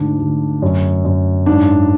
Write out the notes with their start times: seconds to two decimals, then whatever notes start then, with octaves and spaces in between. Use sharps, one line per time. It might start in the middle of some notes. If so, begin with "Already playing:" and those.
Already playing: D2 G#2 D4
0.20 D2
0.62 F#2
1.05 F#2
1.46 G#2 D4